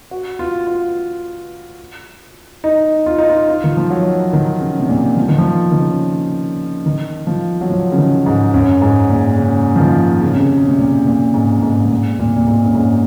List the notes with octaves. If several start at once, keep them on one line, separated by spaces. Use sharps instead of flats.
F#4
F4
F4
D#4
F4
D#4
F4
F4
D#3
F3
F#3
D#3
C#3
C3
A#2
F3
D#3
F3
D#3
C#3
D#3
F3
F#3
F3
C#3
D#3
G#2
F#2
G#2
A#2
C#3
F3
D#3
C#3
C3
C#3
C#3
C3
A#2
A#2
G#2
G#2
G#2
A#2
A#2
C3
A#2
G#2
F#2
G#2